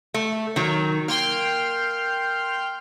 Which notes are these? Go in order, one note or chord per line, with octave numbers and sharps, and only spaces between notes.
A3
D#3 F#3
A#3 G5 C6 F6